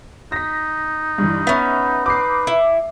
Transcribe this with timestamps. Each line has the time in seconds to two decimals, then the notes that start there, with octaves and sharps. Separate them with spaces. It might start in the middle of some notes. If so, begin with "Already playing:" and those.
0.32 D#4 A#6 B6
1.18 G2 E3
1.47 B3 C#4 B4 E5
2.06 B4 D6 C7
2.47 E4